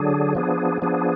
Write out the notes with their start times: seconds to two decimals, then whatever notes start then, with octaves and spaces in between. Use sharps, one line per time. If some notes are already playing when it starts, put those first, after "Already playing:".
Already playing: D3 F#3 D4 G#4
0.35 F3 B3 D4 G#4
0.82 F3 B3 D4 G#4